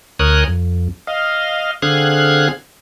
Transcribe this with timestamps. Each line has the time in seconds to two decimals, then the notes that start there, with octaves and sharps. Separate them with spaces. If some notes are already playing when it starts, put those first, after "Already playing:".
0.19 D2 A#4 C#5 G#5 D#6 F#6
0.48 F2
1.07 D#5 F5
1.82 D3 C4 G#4 F5 F#6 G#6